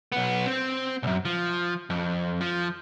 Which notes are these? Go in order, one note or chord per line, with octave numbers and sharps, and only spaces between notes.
B1 B3
C4
B1 F#2
F3
F2
F3